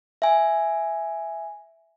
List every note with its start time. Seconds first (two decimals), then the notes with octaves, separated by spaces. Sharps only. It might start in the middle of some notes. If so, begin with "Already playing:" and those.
0.22 E5 G#5